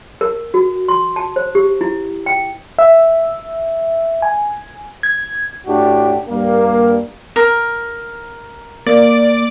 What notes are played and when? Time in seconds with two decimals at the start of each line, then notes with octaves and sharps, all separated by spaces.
0.21 A#4
0.54 F#4
0.88 C6
1.16 A5
1.36 C5
1.55 G4
1.81 E4
2.26 G5
2.79 E5
4.22 G#5
5.03 G#6
5.66 A2 D4 F#4 G4
6.27 G2 G3 A#3
7.36 A#4
8.87 A#3 D5